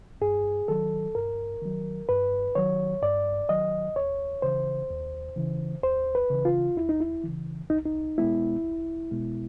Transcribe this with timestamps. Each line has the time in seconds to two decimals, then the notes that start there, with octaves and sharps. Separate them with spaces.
0.21 G2 G#4
0.68 D#3 F#3 A4
1.15 G2 A#4
1.62 D#3 F#3
2.09 G2 B4
2.55 D#3 F#3 C#5
3.02 G2 D5
3.49 D#3 F#3 D#5
3.96 D#2 C#5
4.42 C#3 E3 C5
4.90 D#2
5.36 C#3 E3
5.83 D#2 C5
6.15 B4
6.30 C#3 E3
6.45 F4
6.77 D#2 E4
6.89 D#4
7.00 E4
7.23 C#3 E3
7.70 C2 D#4
7.86 D#4
8.18 B2 G#3 B3 E4
8.64 C2
9.11 B2 G#3 B3